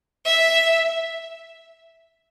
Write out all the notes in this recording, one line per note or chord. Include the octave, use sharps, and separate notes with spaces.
E5